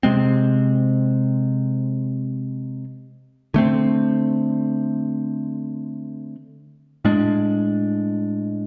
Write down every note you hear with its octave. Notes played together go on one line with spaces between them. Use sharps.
C3 G#3 C4
D3 A3 C4
A2 G#3 D4